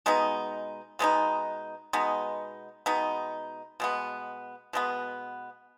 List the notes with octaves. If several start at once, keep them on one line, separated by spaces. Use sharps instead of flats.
B2 G#3 B3 D#4
B2 G#3 B3 D#4
B2 G#3 B3 D#4
B2 G#3 B3 D#4
B2 G#3 B3
B2 G#3 B3